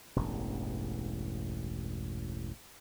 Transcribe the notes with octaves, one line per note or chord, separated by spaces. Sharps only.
E1 A1 G2